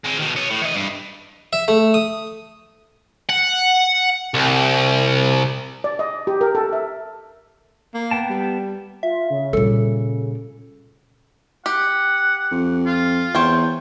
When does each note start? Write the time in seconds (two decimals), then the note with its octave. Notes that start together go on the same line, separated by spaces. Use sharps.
0.04 G#3 C4
0.18 B2 D#3
0.36 C#5 D#5
0.50 A2
0.61 E3 D#5
0.75 G2
1.53 E5
1.68 A3
1.94 D#6
3.29 F#5
4.34 C2
5.84 D5
5.99 D#5
6.27 G4
6.41 A#4
6.55 A4
6.73 E5
7.94 A#3
8.11 B3 G5 A5
8.29 G3
9.03 F4 E5
9.30 C#3
9.53 A#2 G3 A4
11.66 G4 F#5
12.51 F2
12.86 F4
13.35 E2 C5 C#5 G5